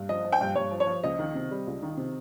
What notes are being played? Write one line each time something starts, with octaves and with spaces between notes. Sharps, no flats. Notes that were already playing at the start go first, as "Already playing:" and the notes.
Already playing: G2
F3 D#5
F3
G5
G2
G2 C#5
F3
C#5
F3
C#2 D#5
D#3
C3
G3
C#2
D#3
C3